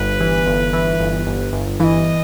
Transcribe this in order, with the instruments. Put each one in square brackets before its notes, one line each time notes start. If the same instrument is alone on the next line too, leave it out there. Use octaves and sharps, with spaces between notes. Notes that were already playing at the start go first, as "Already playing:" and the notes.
Already playing: [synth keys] G1 [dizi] B4
[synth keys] E3
G1
E3
G1
G1
G1
[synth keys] E3 [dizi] D#5 F5